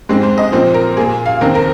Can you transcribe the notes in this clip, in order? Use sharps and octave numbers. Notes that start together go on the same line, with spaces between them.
G#2 G#3 C4
C5
D#5
A#2 F3 C4 C5
A#4
A#2 A#3 G#4
F5
D#2 D#3 C4 A#4
A#4